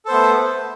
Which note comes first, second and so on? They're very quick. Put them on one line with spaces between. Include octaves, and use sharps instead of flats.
A4 C5 B3 A3